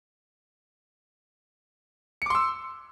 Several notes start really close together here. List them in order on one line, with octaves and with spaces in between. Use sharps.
C#7 D6 C6 E6